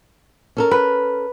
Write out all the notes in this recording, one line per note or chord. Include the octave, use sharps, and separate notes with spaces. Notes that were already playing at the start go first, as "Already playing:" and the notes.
C#4 A4 A#4
B4